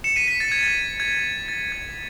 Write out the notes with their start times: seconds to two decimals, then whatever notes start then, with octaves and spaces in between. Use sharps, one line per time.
0.04 C#7 E7
0.16 B6 D#7
0.28 B6
0.40 A6
0.52 G#6
0.63 A6
1.00 G#6
1.48 A6
1.72 G#6